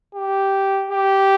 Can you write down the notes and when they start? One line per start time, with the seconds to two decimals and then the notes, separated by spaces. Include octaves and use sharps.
0.15 G4
0.90 G4